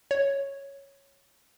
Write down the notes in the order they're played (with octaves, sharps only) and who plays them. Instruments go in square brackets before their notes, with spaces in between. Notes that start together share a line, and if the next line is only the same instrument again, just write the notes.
[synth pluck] C#5